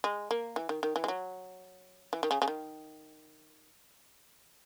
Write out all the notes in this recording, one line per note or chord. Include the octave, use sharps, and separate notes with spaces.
G#3
A#3
E3
D#3
D#3
E3
G#3
F#3
E3
D#3
C#3
C#3
D#3